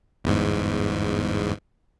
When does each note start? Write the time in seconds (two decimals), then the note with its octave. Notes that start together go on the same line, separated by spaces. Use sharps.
0.24 G1 E2 G#2